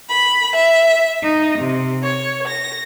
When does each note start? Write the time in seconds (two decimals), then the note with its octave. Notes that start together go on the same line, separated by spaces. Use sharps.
0.10 B5
0.55 E5
1.22 D#4
1.59 C3
2.03 C#5
2.47 A#6